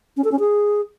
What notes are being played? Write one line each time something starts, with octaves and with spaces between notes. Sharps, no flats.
C#4
A4
C#4
G#4